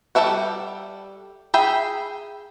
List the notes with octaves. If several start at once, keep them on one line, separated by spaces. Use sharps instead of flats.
G3 A4 A#4 E5 F#5
G#4 E5 G5 B5